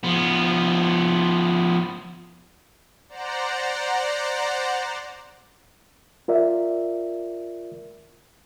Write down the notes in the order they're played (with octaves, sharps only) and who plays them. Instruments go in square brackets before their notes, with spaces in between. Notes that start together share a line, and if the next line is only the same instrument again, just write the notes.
[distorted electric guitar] F3 B3
[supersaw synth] C5 D5 F#5 A#5
[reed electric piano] F4 A#4 D5 E5